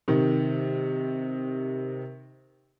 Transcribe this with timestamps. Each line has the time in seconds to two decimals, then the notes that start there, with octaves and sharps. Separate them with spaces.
0.08 C3 D#3